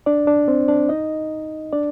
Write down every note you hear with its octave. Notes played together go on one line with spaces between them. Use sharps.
D4 D5
D4 D5
C4 C5
D4 D5
D#4 D#5
D4 D5